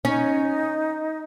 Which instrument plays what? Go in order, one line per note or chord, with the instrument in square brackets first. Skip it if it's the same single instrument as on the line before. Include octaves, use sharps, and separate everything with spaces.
[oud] C#4 [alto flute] D#4